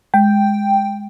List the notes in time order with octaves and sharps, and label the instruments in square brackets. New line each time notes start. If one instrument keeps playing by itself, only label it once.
[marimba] G#3 [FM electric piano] G5